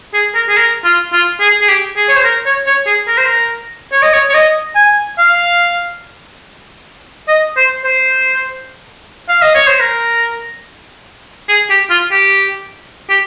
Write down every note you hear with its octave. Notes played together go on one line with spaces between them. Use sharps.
G#4
A#4
G#4
A#4
F4
F4
G#4
G#4
G4
G#4
C#5
C5
A#4
C#5
C#5
G#4
A#4
C5
A#4
C#5
D#5
C#5
C#5
D#5
G#5
F5
D#5
C5
C5
F5
D#5
C#5
C5
A#4
G#4
G4
F4
G4
G4